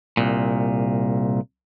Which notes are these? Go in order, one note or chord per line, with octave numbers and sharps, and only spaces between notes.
C2 A#2